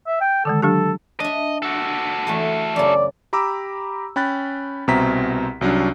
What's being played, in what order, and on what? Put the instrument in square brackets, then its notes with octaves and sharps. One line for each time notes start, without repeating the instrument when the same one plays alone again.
[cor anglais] E5
G5
[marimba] D3 D#3 G#3 [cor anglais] A4
[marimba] F#3 D4 G4 [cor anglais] A4
[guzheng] D4 E5 [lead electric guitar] D#5
[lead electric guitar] F#4 A4
[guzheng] E2 A3 A5
[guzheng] F#2 C#3 [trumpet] D5
[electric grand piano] G4 A#5 B5 D6 E6
C#4 G5 B5 F#6 A6
C2 B2 C4 E5 A#5 B6
C2 F#3 C#4 D4